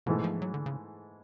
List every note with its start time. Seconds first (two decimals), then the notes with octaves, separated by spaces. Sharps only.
0.06 G#2 B2 E3 A3
0.24 F3
0.42 F#3
0.54 D3
0.66 C#3